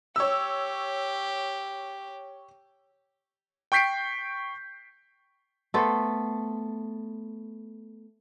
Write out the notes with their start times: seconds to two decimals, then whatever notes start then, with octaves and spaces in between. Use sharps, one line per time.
0.16 G4 C#5 E6
3.72 G5 C#6 G6 B6 C7 D7
5.74 A3 B3 A4 C5